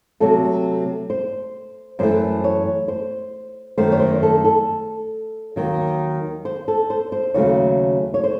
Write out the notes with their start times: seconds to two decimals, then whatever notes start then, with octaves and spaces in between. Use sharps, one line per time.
0.20 C3 F#3 A3 A4
1.10 C5
1.99 F#2 E3 A3 C5
2.44 C#5
2.88 C5
3.78 F#2 D#3 A3 C5
3.92 C#5
4.00 C5
4.23 A4
4.45 A4
5.56 D#2 D#3 F#3
6.45 C5
6.68 A4
6.90 C5
7.12 C5
7.34 D#2 C#3 F#3 A3 C#5
8.14 C#5
8.24 C5